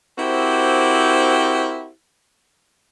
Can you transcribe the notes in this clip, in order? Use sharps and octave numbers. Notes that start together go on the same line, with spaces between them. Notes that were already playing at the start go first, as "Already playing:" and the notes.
C4 E4 F#4 G4 A#4 C5